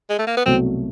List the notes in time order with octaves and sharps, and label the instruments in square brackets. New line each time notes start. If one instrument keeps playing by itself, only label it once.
[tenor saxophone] G#3
A3
A#3
B3
[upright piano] C2 B2 F#3 A3 [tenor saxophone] C4